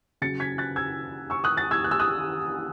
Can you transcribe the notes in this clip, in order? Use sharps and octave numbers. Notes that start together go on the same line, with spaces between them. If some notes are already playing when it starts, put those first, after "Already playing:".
C#3 F#3 A6 C#7
G#6 B6
F#6 A6
E6 G#6
C#6 E6
D#6 F#6
F#6 A6
E6 G#6
F#6
E6
D#6 F#6